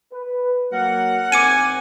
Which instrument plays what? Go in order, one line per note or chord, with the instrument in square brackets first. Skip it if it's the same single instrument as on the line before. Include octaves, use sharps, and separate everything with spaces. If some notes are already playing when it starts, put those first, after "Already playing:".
[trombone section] B4
[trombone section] F#3 A#3 [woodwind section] A#4 F#5
[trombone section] E2 G#2 C4 [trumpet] G#5 [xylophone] D6 C#7 D#7